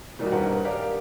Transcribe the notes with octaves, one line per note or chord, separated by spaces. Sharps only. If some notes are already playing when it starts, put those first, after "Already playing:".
A#2 D#3 G3 A#3 D#4 F#4
D#1 G2 A#4 B4 F#5
G4 A#4 D5 F5